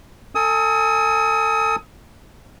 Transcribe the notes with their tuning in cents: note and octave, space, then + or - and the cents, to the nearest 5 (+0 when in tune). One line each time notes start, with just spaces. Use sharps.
A4 +30 G#5 +0 D#6 +35